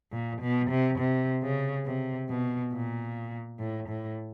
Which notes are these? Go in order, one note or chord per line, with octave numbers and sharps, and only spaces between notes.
A#2
B2
C3
C3
C#3
C3
B2
A#2
A2
A2